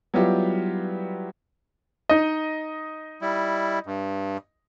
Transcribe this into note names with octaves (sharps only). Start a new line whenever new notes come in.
F#3 G3 B3 E4 F4 G4
D#4 D#5
G3 E4
G2